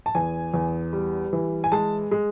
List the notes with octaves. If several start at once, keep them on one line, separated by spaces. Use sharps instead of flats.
A5
E2 G#5
E2
G3
E3
G#5
G#3 A5
G#3